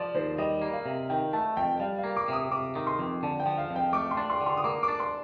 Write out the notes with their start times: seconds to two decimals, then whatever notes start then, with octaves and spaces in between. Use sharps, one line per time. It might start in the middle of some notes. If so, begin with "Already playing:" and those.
Already playing: F3 D5
0.15 D#2 C5
0.38 G3 D#5
0.62 A#3
0.73 F5
0.86 C3
1.10 D#3 G5
1.33 A3 A5
1.57 F2 G5
1.80 G3 F5
1.98 F5
2.04 A#3
2.17 D6
2.28 C3 D#6
2.51 C3 D6
2.75 D#3
2.87 C6
2.99 F2
3.23 D3 A5
3.40 G5
3.46 F3
3.58 F5
3.70 F2
3.76 G5
3.93 A3 D6
4.11 C6
4.17 D4
4.30 C6
4.41 D3
4.46 C6
4.57 D#6
4.64 A#3 D6
4.83 D6
4.88 D4
5.00 C6